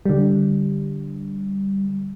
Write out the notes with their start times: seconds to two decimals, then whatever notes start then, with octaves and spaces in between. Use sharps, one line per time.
0.06 D3 G3